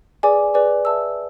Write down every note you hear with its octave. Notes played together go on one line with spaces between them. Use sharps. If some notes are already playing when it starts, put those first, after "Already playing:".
G#4 B4 D5 G#5 D6
G#4 B4 D5 G#5 D6
B4 E5 A5 E6